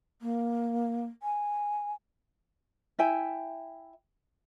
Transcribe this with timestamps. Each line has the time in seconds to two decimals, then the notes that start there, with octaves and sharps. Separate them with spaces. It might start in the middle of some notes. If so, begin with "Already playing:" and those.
0.22 A#3
1.23 G#5
2.99 E4 E5 G5 G#5